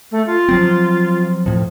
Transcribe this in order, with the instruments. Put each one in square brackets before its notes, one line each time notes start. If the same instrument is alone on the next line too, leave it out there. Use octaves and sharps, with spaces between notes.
[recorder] A3
F4
[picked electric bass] F3 F#3 C4
A2 F3